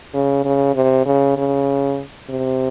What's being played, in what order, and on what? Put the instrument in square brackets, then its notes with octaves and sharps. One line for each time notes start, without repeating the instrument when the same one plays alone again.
[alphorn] C#3
C#3
C3
C#3
C#3
C3